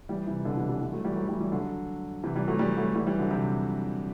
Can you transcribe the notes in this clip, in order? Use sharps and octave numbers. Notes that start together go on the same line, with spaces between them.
E3 G3
C3 E3
B2 D3
C3 E3
E3 G3
E3 G3
F#3 A3
E3 G3
F#3 A3
E3 G3
E3 G3
D3 F#3
C3 E3
E3 G3
F#3 A3
E3 G3
F#3 A3
E3 G3
E3 G3
D3 F#3
C3 E3